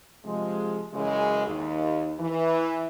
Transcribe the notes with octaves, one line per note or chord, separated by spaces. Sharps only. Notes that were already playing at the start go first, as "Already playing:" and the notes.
C3 F3 G#3
F#2 C#3 E3 G#3
D#2
E3